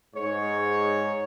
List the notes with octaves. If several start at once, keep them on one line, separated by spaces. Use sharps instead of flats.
G#2 C#5